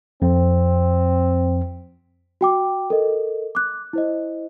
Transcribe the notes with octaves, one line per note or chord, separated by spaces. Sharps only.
F2 C4
F#4 G5 D6
A4 A#4 D#5
D6 F#6
E4 C5 D#5